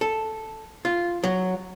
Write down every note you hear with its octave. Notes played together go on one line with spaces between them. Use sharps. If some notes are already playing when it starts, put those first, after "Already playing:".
A4
F4
F#3